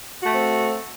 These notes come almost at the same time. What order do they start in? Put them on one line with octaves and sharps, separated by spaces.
F#4 A3 C4